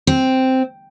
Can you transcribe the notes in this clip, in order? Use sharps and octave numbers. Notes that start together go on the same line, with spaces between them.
C4